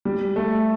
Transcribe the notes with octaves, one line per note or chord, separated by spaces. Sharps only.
G3
A3